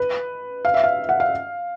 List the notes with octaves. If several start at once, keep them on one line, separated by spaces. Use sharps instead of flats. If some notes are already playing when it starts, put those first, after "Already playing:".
Already playing: B4
F5
E5
F5
F#5
F5